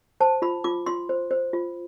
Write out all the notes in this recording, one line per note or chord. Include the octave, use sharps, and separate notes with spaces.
C5 A5
F4 B5
F4 D6
F4 C6
C5
C5
F4